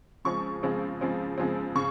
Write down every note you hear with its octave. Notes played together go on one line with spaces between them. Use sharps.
C#3 F3 G#3 C4 C#6
C#3 F3 G#3 C4
C#3 F3 G#3 C4
C#3 F3 G#3 C4
C#3 C#6